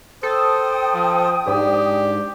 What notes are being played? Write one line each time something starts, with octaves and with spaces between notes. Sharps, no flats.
A4 C5 G5 D#6
F3
G#2 D4 G4